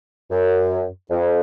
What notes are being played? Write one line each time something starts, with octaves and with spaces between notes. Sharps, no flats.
F#2
F2